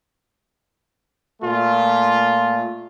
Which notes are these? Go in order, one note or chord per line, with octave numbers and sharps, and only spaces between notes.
A#2 A3 F4